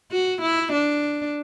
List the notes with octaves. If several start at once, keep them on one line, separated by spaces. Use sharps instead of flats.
F#4
E4
D4